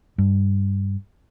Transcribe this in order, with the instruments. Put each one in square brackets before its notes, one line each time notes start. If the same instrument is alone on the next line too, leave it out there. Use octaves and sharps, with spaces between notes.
[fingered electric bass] G2